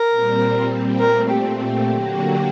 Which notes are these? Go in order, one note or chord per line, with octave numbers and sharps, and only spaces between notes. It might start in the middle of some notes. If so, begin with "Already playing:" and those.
Already playing: A#4
A#2 G3 C4
A#2 A3 C4 A#4
G4
G4
D3 F#3 A#3 F#4